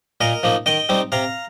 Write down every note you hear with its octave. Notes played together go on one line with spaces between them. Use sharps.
A#2 A#4 D#5
F3 A#3 D#4
D#3 D#5 G5
G3 C4 D#4
C3 F5 A#5